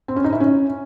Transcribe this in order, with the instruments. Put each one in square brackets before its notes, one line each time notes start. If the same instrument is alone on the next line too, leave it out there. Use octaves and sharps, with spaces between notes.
[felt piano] C4
C#4
D#4
E4
C#4